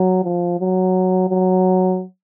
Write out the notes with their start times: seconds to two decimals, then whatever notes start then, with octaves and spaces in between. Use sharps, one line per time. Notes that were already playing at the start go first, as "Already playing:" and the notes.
Already playing: F#3
0.24 F3
0.60 F#3
1.30 F#3